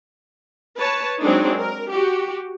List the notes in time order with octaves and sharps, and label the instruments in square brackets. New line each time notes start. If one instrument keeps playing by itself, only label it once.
[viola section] B4 C#5 A5
F#3 G#3 C4 D4 D#4
A#4
F#4 G4